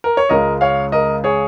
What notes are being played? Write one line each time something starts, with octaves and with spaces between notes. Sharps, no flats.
A#4
C#5
C#2 C#3 G#3 A#4 D#5
C#5 F5
A#4 D#5
G#4 C#5